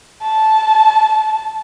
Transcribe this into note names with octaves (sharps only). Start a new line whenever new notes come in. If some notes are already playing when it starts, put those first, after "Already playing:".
A5